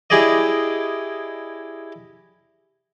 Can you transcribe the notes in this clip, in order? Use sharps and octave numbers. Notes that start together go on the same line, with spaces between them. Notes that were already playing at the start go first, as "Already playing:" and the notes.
E4 G4 G#4 D5 D#5